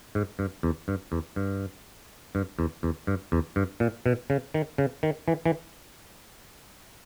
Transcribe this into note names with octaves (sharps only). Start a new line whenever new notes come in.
G#2
G2
E2
G2
E2
G2
G2
E2
E2
G2
E2
G2
A#2
B2
C#3
D#3
C#3
D#3
E3
E3